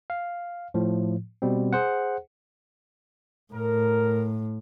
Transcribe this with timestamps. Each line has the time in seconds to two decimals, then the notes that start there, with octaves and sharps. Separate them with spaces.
0.10 F5
0.74 A2 F3
1.42 B2 G3 C4
1.73 G#4 C5 F#5
3.53 A2 A#4